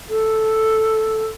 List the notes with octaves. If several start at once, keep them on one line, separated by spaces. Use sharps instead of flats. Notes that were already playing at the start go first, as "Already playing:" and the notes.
A4